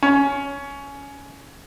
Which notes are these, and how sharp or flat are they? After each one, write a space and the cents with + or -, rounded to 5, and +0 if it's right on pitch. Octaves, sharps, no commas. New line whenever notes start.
C#4 +15